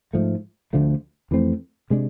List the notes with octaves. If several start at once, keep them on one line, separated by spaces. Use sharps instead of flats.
G#2 F3 A3
D2 D3 F3 A3
F2 E3 A3 C4
C3 G#3 D4